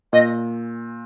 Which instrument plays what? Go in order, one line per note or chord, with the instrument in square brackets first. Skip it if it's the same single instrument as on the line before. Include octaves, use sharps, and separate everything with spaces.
[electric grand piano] A#2 [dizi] D#5